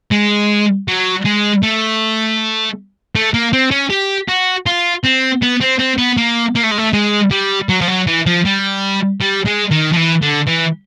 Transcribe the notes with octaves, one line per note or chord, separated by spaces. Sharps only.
G#3
F#3
G#3
A3
A3
A#3
C4
C#4
G4
F#4
F4
C4
B3
C4
C4
B3
A#3
A#3
A3
G#3
A3
G#3
G3
F#3
F3
F#3
E3
F3
G3
G3
G#3
D#3
F3
E3
D3
E3